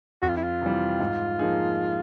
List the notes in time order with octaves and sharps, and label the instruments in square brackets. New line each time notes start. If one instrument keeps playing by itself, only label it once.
[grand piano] F2 [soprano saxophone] F#4
[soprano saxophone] F4
E4
F4
[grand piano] C3 E3 G3
G#2
F3 A#3 D#4 G#4